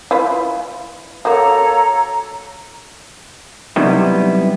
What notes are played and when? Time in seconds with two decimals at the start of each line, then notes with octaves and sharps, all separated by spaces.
0.11 E4 F4 B4
1.25 F#3 A#3 A4 C#5 A#5
3.76 C3 F#3 G3 B3 D#4 E4